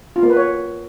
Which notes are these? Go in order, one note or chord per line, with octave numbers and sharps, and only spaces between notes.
F4
A#3
B4
C#5